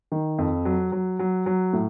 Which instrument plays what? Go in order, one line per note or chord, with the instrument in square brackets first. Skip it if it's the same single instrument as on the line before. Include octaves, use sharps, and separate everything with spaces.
[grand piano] D#3
F2
F#3
F#3
F#3
F#3
A2